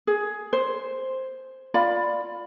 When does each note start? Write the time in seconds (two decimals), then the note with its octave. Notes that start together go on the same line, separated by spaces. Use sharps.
0.07 G#4
0.53 C5
1.74 F4 D5 F5 B5